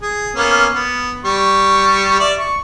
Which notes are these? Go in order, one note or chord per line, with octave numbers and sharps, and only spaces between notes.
G#4
A#3 B3 C#4
B3
G3 C#6
D5 E5
C#6